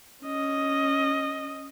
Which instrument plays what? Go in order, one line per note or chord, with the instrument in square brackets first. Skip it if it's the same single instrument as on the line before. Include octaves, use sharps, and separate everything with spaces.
[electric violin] C#4 D#5